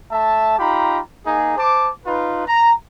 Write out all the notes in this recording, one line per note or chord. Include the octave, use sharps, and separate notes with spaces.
A3 E5 A5
D#4 F4 G4 A#5 B5
A#3 D#4 G#4
C5 A5 D6
D#4 F4 B4
A#5